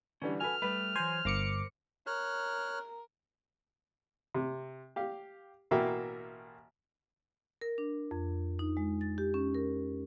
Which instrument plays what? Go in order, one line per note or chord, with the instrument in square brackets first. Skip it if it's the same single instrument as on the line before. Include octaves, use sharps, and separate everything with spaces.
[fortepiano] D3 E3 G3 [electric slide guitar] C#4
[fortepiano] F#4 A4 B4 [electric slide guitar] G#5 [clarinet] F6
[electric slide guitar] G3 A3 [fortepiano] B4
[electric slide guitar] E3 F#3 [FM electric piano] C5 G#5
[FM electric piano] G1 D6 C#7 [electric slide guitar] A#4 C5
[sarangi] A#4 [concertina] C#5 F6 F#6
[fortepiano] C3
G4 F5
A1 B2 A#3 E5 G5
[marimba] A#4
D4
F2
D#4
G#3
A6
G4
C#4
A#4